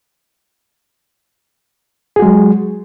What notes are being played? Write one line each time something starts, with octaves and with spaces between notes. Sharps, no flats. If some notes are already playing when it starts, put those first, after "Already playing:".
F#3 G#3 F#4 G#4